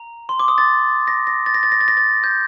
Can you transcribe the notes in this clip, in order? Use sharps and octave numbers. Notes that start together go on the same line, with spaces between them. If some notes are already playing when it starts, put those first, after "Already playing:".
Already playing: A#5
C6
D6
D#6
A6
A#6
A#6
A6
A#6
A6
A#6
A6
A#6
A6
G6